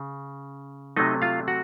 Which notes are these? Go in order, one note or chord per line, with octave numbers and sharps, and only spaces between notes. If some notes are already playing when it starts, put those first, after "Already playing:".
Already playing: C#3
C3 F#3 A3 D#4 D#5
F4 F5
F#4 F#5